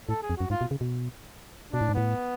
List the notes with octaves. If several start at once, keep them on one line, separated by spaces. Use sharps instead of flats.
A2 A4
G#4
F2
F#2 F#4
G#2 F4
B2
C#3
B2
B2 D4
A2
G#2
A2 B3